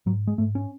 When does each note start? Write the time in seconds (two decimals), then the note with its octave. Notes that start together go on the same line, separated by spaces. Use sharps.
0.06 G#2 F#3
0.27 G#3
0.38 G#2 A3
0.55 C#4